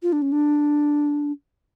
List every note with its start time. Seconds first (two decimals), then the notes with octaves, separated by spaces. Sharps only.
0.03 F4
0.13 D4
0.22 C#4
0.32 D4